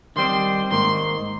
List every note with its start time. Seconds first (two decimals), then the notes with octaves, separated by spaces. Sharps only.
0.16 D#3 G3 C4 C6
0.71 G#2 D#3 A#3 C6